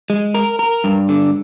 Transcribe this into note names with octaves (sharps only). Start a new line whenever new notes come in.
G#3
A#4
A#4
G2
D3